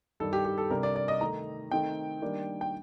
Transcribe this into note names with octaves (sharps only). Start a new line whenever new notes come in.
G2 D#3 G3 A4
G4
G4
A4
C3 G3 D4 A#4
D5
D5
D#5
D#3 A3 D#4 A#5
D#3 A3 C4 D#4 G5
D#3 G3 A#3 D4
G5